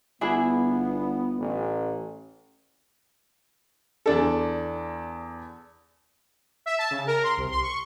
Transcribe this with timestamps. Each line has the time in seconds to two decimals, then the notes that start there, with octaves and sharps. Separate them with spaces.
0.21 G1 B3 D4 E4 G#4
1.39 A1
4.06 E2 D4 A4
6.66 E5
6.78 A5
6.91 C#3
7.07 A#4
7.24 C6
7.37 C2
7.51 C6
7.63 C#6